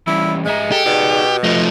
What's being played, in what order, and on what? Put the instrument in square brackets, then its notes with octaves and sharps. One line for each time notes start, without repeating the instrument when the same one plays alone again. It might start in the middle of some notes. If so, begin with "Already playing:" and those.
[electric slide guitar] E3 G3 C#4 [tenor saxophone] E4
[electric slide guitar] G#2 E5 A#5 [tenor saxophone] G#3
[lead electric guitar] G4 [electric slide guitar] A4
[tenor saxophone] B2 [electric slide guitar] D#4 G#4 D5
[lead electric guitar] F3 A3 [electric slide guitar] D#5